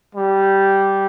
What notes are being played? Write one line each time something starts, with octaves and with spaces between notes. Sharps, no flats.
G3